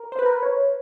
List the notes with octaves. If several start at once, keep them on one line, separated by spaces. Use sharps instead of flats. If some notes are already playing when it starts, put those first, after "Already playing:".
Already playing: A#4
C5
B4
A#4
B4
C#5